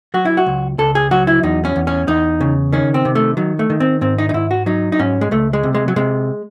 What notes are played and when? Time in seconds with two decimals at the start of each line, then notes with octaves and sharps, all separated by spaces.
0.14 F#3 F#4
0.25 E4
0.37 F#4
0.46 C#2
0.78 C#2 A4
0.95 G#4
1.11 F#3 F#4
1.27 E4
1.43 E2 D#4
1.65 C#4
1.76 E2
1.87 C#4
2.08 E2 D#4
2.41 C#3
2.72 D#3 C#4
2.94 C4
3.05 C3
3.15 A3
3.37 D#3 F#3
3.59 A3
3.70 D#3
3.80 C4
4.01 G#2 C4
4.18 D#4
4.29 D#4
4.34 G#2 E4
4.51 F#4
4.66 F#3 D#4
4.92 D#4
4.99 G#2 C#4
5.21 G#3
5.31 C#2 A3
5.53 G#3
5.63 C3
5.75 G#3
5.88 F#3
5.96 C3 G#3